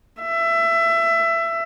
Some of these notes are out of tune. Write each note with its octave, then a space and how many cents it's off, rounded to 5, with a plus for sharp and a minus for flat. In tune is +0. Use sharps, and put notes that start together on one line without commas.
E5 +20